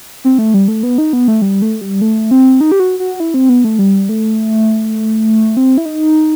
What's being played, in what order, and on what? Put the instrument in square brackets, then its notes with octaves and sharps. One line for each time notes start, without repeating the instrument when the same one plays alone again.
[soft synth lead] C4
A3
G3
A3
B3
D#4
B3
A3
G3
A3
G3
A3
C4
D#4
G4
F#4
F#4
E4
C4
B3
A3
G3
A3
C4
E4
D#4